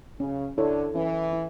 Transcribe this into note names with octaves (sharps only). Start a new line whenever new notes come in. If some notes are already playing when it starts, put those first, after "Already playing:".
C#3 C#4
D3 E4 A4 C#5
E3 C#4
E4